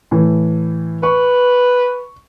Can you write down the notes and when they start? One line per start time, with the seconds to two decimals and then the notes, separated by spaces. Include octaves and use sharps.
0.11 A2 E3
1.03 B4 C#6